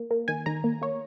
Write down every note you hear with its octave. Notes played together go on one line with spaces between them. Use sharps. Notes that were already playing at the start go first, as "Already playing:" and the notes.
Already playing: A#3
A#3
D#3 G#5
D#3 A#5
A#3
A#3 C#5